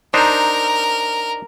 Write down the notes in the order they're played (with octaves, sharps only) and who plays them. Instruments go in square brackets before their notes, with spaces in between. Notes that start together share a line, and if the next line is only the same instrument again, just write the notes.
[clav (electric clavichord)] D4 D#4 C5 [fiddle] A#4